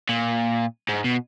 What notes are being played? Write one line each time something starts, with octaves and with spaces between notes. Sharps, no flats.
A#2
G#2
B2